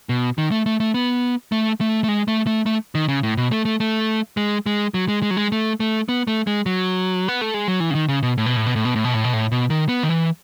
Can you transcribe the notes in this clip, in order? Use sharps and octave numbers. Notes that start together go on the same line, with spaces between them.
B2
D#3
A3
A3
A3
B3
A3
A3
A3
G#3
A3
A3
A3
D#3
C#3
A2
B2
A3
A3
A3
G#3
G#3
F#3
G#3
G#3
F#3
G#3
A3
A3
B3
A3
G#3
F#3
B3
A3
G#3
F#3
E3
C#3
D#3
C#3
B2
A2
B2
A2
B2
A2
B2
A2
B2
A2
B2
A2
B2
D#3
B3
D#3
E3